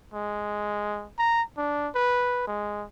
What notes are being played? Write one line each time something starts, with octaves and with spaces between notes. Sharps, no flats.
G#3
A#5
D4
B4
G#3